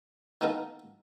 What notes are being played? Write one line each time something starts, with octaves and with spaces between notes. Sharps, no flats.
D#3 A#3 B3 D#4 A4 A#4